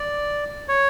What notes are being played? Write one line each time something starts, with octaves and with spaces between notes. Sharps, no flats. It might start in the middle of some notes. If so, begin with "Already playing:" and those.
Already playing: D5
C#5